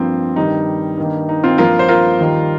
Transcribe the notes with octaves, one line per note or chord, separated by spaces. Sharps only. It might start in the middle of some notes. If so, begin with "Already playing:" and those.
Already playing: G2 F3 A#3 C4
G2 D#3 G3 D#4
G2 D#3 A#3
D#4
C4 F4
G2 F3 A#3 F4 A#4
C5
F4 A#4
D#2 D#3 G3 A#3